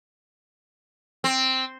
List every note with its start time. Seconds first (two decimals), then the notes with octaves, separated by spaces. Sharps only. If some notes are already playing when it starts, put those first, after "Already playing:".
1.24 C4